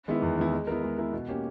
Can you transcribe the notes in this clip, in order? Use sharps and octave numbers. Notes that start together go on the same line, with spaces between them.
D#3 G#3 B3 E4
E2
D#3 G#3 B3 E4
G#3
B3 E4 A#4
G#3
B3 E4 A#4
B2
A#3 C#4 G4